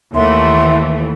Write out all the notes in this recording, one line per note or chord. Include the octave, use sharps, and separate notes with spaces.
D#2 E3 A3 E5 F#5 C6